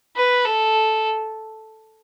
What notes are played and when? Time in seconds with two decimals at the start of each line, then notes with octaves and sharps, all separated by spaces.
0.16 B4
0.45 A4